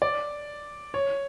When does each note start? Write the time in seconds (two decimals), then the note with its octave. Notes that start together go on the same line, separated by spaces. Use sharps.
0.02 D5
0.94 C#5